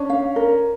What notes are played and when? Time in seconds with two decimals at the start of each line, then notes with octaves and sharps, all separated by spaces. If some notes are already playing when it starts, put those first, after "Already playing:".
Already playing: C#4 D4
0.10 F5
0.36 A#4